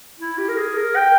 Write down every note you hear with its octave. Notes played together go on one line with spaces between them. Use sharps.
E4
G4
A#4
G#4
A#4
G5